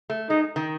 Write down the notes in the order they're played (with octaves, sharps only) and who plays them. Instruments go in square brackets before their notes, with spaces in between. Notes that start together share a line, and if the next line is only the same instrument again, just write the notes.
[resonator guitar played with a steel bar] A3
[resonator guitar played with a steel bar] G#3 [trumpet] D#4
[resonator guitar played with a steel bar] D#3